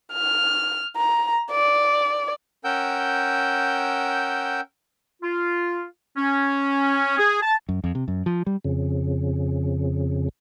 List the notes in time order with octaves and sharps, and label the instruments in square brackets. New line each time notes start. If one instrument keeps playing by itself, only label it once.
[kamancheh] F6
A#5
D5
[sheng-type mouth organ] C#4 A#4 F#5 G5 E6 G6
[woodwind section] F4
C#4
G#4
A5
[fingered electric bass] F#2
F2
C3
F#2
F3
G3
[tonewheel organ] F2 C#3